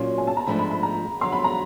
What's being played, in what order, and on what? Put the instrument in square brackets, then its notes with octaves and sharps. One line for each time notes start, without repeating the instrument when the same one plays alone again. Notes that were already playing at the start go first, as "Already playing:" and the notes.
Already playing: [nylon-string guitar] A#2 F#3 A#3 C#4 F4 [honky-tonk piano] C6
[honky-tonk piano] G#5
A5
A#5
[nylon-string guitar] G#2 F3 A3 D4 [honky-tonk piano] B5
[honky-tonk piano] B5
B5
A#5
[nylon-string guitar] F2 D3 F#3 [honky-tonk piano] C6
[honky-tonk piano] B5
A#5